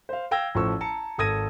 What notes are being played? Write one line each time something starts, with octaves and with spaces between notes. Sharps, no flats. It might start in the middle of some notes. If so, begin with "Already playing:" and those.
C5 F5
F5 G5 E6 G#6 A#6
A1 F3 A4 C#6 E6
A5 A#5 C#7
G#1 A4 D#6 G#6 A#6 D#7